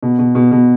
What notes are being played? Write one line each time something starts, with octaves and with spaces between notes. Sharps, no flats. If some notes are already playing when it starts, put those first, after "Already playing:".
B2
B2
B2
B2